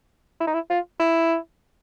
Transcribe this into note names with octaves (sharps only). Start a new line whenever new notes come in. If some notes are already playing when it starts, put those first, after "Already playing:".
E4
D#4
E4
F4
E4